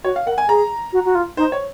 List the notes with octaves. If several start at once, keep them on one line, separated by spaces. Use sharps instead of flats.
F#4 C#5
F5
A#4 F#5
G#5
G#4 A#5
F#4
F#4
F4
D#4 C5
C#5